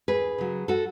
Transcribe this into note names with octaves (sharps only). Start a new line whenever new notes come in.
D#2 G#4 B4
C#3 F#3
F#4 A4